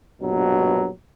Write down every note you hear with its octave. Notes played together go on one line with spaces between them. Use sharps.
A#1 G2 B2 F#3